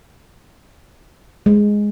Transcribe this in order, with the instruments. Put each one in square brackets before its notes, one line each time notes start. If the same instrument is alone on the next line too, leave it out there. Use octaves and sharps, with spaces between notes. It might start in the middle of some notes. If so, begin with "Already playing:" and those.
[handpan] G#3